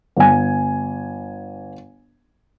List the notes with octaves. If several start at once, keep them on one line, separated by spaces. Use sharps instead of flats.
G1 G#5